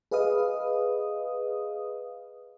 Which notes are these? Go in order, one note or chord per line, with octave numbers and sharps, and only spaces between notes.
G#4 B4 D#5 F5 D#6